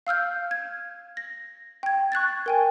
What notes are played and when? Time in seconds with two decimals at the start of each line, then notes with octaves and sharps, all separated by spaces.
0.07 F5 E6 F6 G6
0.51 G#6
1.17 A#6
1.83 G5 G#6
2.12 C#6 F#6 G#6 A6
2.46 A#4 G5 G#5